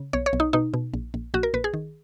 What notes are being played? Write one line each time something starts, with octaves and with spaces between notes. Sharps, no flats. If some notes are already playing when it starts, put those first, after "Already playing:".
Already playing: C#3
B1 C#5
C#5
B1
D#4
B2 D#4
B2
A#1
A#1
A#1 F#4
A#4
A#1 B4
G#4
D#3